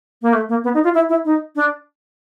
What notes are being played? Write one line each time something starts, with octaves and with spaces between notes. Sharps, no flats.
A#3
A3
A#3
B3
D#4
F4
E4
E4
D#4
D4